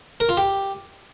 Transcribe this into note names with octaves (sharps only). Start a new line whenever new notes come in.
A#4
F4
G4